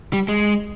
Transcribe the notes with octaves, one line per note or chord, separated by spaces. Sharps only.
G3
G#3